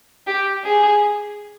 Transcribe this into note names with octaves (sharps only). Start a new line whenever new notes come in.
G4
G#4